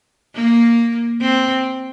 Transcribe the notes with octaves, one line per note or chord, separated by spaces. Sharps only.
A#3
C4